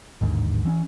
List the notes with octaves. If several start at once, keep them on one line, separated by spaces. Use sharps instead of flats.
A1 D#2 G#2 D3
E3 C#4